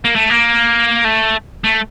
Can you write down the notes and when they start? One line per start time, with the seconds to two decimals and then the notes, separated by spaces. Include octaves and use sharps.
0.05 A#3
0.15 A3
0.30 A#3
1.05 A3
1.64 A3